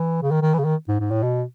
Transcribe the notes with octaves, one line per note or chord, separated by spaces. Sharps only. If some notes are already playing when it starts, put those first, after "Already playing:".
Already playing: E3
C#3
D#3
D#3
E3
C#3
D#3
G#2
G#2
A2
B2